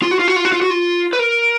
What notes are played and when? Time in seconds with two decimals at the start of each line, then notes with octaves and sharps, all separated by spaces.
0.02 F4
0.11 F#4
0.19 F4
0.28 F#4
0.36 F4
0.45 F#4
0.53 F4
0.62 F#4
0.70 F4
1.13 B4
1.19 A#4